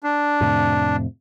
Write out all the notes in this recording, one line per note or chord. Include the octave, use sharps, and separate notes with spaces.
D4
F2 A2 C3